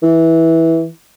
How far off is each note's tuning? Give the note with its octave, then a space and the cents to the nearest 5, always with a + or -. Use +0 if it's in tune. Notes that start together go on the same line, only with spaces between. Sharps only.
E3 -10